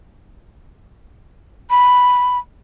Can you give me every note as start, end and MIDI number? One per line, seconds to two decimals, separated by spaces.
1.70 2.38 83